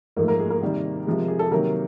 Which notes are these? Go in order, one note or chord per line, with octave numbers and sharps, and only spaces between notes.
G#2 F3 A3 A#3 A#4
A#3 A#4
G#3 G#4
A#3 A#4
C3 D#3 G3
C3 F3 G#3
G#4
A4
C3 D#3 F#3 A#3 A#4